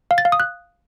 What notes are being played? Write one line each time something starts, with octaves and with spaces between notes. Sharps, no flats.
F5
A6
F5
D#6
F#6